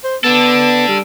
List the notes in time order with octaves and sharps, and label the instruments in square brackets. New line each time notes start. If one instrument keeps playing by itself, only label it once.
[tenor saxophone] C5
[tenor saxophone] B3 [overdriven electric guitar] D4 A4
[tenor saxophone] G3